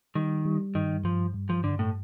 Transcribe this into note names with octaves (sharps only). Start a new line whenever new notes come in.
D#3 G3
G3
G2 D#3
G2 F3
G2
F3
G2 D3
A2